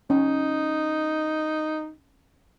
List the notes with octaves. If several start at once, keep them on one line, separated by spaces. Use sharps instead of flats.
C#4 D#4